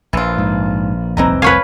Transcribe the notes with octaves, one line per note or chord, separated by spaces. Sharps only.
A#1 E3 F4
G#2
F1 C2 E3 C4 D#4 A#5
B4 C#5 F5 G#5